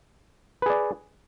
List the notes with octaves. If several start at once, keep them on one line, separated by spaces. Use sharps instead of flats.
G#4 B4 D5